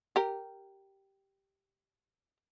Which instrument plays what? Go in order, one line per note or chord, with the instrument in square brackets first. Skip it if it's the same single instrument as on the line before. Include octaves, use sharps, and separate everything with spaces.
[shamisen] G4 A#4